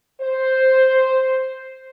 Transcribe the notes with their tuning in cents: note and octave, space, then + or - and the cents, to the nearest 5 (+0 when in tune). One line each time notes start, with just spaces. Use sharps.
C5 +0